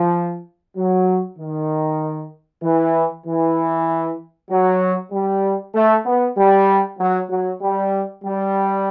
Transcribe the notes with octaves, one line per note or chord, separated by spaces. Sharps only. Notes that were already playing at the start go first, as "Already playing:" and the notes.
Already playing: F3
F#3
D#3
E3
E3
F#3
G3
A3
B3
G3
F#3
F#3
G3
G3